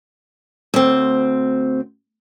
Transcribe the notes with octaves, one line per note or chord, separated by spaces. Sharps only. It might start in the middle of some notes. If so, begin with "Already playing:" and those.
D2 C4